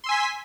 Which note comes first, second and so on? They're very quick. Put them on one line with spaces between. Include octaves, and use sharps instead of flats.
C6 E6 G#5 B6